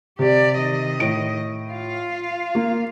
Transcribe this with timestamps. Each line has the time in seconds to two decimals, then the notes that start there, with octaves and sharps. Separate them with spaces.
0.19 C3 G4 D5
0.58 D#3 D#5
1.00 A2 D7
1.72 F4 F5
2.55 A#3